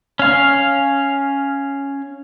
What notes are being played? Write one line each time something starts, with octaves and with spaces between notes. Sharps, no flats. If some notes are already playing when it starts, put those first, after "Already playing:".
C#4 F5